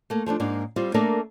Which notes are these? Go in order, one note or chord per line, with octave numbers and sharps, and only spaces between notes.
A3 A#3
F3 A3 C#4 D4
G#2 A#3 D4
G3 C4 F4
A3 A#3 D4 A4 A#4 D5